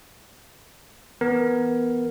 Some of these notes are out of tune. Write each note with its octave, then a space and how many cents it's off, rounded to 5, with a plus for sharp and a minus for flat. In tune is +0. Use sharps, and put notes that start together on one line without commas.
E3 +0 B3 -5 A#4 +0